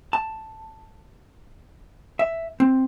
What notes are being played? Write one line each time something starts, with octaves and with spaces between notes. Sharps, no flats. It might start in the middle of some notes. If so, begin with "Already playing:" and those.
A5
E5
C4